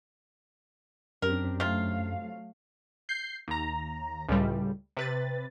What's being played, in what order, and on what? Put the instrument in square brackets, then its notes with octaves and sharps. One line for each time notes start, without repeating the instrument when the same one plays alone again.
[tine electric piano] F#2 [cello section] C4 D4 G4 [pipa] A#4
[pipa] C3 F4 [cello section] F#3 A3 F5
[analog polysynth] G6 C7
D#2 A#5
C#2 A2 G3
C3 B4 A6